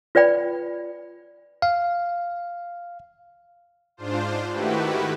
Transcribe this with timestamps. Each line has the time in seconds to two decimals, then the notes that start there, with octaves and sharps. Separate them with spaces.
0.15 F4 B4 D5 G5 B5
1.62 F5
3.97 G#2 D4 F4 C5
4.51 D#3 A3 E4 F#4 G4 B4